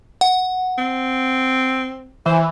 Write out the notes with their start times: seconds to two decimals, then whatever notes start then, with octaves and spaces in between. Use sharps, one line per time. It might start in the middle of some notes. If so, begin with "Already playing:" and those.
0.21 F#5
0.78 C4
2.26 E3 C5